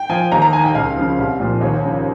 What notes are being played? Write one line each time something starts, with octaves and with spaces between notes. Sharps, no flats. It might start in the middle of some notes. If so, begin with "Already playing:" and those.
Already playing: G5
F3 G#5
D#2 A#5
A#5
D#3 G#5
G5
C#2 F5
C#3 F3
C2
A#2 F3
D#2 C#5
C#3 F3